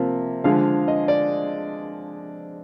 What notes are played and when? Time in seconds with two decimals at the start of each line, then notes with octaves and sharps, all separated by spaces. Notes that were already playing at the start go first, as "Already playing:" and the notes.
Already playing: C3 F3 A#3
0.44 D3 F3 G#3 F5
0.88 D#5
1.08 D5